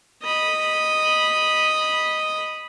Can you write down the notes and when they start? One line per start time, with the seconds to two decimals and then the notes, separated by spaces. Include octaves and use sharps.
0.23 D#5 B5